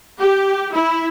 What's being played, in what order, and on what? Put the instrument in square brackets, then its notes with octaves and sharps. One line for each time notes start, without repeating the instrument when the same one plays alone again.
[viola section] G4
E4